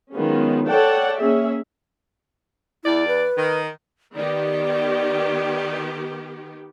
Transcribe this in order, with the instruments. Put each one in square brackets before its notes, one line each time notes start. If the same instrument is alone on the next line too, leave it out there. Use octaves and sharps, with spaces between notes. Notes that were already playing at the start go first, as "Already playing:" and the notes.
[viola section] D#3 F#3 G#3 B3 C#4 F4
A4 C#5 D5 F#5 G5 A5
A#3 C#4 G#4 E5
[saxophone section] E2 D5 [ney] E4
[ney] B4
[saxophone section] D#3
[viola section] D#3 B3 G4 [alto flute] D5